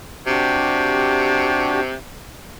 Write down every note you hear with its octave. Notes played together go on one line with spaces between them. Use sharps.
C3 D4 F#4 G4